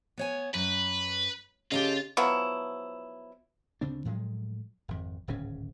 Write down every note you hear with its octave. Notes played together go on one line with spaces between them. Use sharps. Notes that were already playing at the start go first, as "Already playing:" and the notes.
B3 C#5 G#5
F#2 B4
C#3 F4 G4 A4 D#5
F3 F#3 B3 E4
D2 C#3 C4 D4
A2 F3 F#3 G#3
G#1 F2
D1 G#1 C#3 C#4